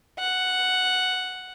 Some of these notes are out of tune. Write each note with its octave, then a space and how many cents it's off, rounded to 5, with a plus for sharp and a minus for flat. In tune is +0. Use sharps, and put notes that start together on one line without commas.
F#5 +0